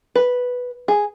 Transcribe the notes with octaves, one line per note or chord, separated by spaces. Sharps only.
B4
G#4